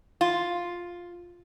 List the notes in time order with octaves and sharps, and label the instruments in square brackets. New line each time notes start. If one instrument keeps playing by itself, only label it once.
[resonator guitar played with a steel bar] F4